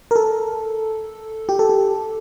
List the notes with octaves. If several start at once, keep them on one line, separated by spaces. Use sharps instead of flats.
A#4
A4
G4
A4
G4